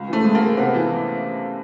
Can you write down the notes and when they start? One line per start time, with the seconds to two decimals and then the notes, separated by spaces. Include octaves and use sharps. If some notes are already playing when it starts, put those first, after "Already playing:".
Already playing: C#2
0.08 E3 A3
0.24 G#3
0.35 A#3
0.41 G#3
0.57 C3 B3
0.74 E3